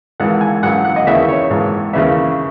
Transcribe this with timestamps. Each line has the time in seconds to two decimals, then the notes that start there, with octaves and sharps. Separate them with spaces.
0.20 G#1 G#2 E3 F#5
0.41 G#5
0.63 G#1 F#2 E3 F#5
0.85 F#5
0.96 D#5
1.07 D#2 C#3 E3 E5
1.28 C#5
1.50 G#1 G#2 E3
1.93 D#2 C#3 E3 E5